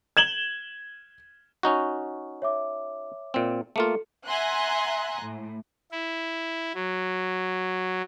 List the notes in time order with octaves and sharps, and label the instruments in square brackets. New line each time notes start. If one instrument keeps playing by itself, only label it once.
[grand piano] G#6 E7 F#7 G7
[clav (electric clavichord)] C#4 D#4 F#4
[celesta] C#5 E5 D6
[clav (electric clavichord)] A#2 C4
[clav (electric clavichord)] A3 A#3 F4 [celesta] A4 C#7
[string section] E5 F#5 G#5 A#5 C6 F#6
A2
[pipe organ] E4
F#3